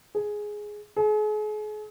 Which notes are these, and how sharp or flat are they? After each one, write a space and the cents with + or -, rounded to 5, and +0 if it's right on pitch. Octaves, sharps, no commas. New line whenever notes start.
G#4 +5
G#4 +40